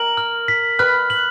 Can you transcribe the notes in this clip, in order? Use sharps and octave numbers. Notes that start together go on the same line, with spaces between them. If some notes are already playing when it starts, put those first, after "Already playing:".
Already playing: A#4 F#7
F6
B6
B4 F6
F#7